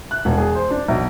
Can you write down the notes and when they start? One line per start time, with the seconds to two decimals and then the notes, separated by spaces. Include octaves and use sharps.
0.11 F#6
0.25 E1
0.37 G#4
0.55 C5
0.70 D4
0.88 B1